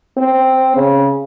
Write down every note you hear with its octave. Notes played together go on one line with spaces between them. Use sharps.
C4
C#3